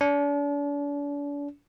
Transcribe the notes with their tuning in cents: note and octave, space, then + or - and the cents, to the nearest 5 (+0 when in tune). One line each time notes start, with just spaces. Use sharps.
D4 -40